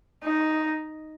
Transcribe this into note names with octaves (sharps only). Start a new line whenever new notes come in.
D#4